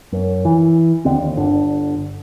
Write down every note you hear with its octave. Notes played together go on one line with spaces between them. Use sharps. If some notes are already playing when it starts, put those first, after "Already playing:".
F#2
E3
D#2 D3 C4
D#2
G1 D3